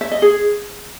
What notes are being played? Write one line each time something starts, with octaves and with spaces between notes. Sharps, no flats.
E5
D#5
G#4